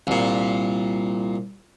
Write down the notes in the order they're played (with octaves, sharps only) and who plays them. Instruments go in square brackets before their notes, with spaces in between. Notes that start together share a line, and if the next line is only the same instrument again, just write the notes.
[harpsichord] C2 A#2